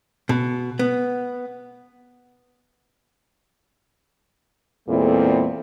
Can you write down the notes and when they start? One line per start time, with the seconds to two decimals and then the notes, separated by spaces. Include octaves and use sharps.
0.29 B2
0.79 B3
4.89 E2 A#2 G#3 C4 E4 A4